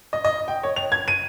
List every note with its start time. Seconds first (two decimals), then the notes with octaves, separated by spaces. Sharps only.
0.13 D#5
0.25 D#5
0.48 G5
0.63 C#5
0.76 F7
0.92 G#6
1.08 D#7